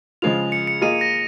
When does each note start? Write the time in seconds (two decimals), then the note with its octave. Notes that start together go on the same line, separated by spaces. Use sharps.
0.22 C#3 F3 G#3 F4 F7
0.52 C#7
0.67 C#7
0.81 A#3 F4 G#4 D#5 D#7
1.01 A#6